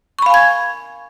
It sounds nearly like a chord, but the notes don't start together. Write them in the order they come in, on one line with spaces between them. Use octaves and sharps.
C#6 B5 F5 G#5 G#6